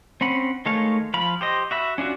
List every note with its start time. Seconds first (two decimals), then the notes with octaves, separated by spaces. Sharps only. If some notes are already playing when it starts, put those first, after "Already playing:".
0.21 C4 C#4 F#5 B5
0.66 D#3 G#3 A3 C#5 F5
1.14 F3 F5 B5
1.41 G4 C5 D#5
1.71 F#4 E5 B5
1.98 C#4 D4 F4 F#4